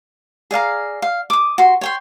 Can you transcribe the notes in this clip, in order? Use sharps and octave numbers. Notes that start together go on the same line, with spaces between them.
G#4 D5 F5 A#5
F5
D6 D#6
F#4 C6
C#5 G5 C6